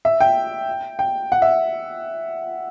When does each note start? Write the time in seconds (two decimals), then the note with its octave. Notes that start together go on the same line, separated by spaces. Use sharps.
0.05 E5
0.21 G5
0.99 G5
1.32 F#5
1.42 E5